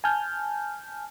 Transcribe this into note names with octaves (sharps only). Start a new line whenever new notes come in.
G#5 A5 F6 G6